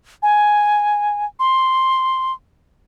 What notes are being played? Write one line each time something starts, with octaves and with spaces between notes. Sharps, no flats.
G#5
C6